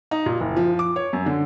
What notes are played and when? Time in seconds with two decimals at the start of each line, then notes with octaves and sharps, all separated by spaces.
0.11 D#4
0.26 A#2
0.41 F#1
0.56 F3
0.79 D6
0.96 C#5
1.13 F#2
1.26 D3